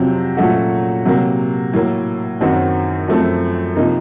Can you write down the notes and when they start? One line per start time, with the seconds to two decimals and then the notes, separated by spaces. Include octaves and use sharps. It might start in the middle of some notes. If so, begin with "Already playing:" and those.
Already playing: F2 C3 F#3 C4
0.37 A#2 F#3 A3 C#4 F#4
1.05 C3 F#3 A#3
1.73 A2 F#3 A#3
2.41 F#2 D#3 F#3 C4 F#4
3.08 F#2 F3 A3 C4
3.76 C3 F3 A#3 D#4